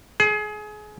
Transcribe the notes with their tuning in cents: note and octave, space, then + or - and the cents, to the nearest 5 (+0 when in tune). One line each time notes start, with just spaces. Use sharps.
G#4 +25